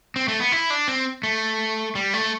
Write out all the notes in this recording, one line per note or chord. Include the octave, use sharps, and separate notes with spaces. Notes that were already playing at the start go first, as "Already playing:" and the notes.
C4
A3
B3
E4
D4
C4
A3
G3
A3